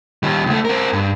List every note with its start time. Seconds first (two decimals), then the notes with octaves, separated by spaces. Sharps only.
0.23 D#3 G3
0.46 C#2 A3
0.65 C4 A#4
0.93 G2